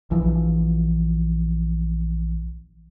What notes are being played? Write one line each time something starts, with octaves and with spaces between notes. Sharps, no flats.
A#1 E3 F3